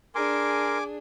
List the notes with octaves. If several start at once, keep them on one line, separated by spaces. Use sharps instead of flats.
D4 G#4 A#4 G#5 C6 D6